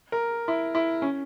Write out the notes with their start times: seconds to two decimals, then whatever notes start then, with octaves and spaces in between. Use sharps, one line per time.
0.12 A#4
0.48 E4
0.75 E4
1.02 C#4